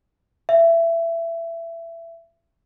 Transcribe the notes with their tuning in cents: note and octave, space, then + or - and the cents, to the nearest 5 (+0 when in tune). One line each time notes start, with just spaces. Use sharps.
E5 +20